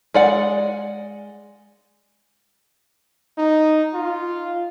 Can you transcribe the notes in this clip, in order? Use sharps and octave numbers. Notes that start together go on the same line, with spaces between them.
G#3 D5 F#5
D#4
F4